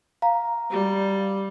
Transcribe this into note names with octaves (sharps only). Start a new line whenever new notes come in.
F5 A#5
G3